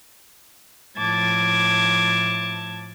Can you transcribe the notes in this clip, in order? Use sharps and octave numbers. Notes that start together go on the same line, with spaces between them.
A2 F3 A5 D6 G#6